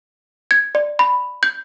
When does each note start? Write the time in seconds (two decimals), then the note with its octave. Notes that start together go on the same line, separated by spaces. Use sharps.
0.51 G#6
0.75 D5
0.99 B5
1.43 G6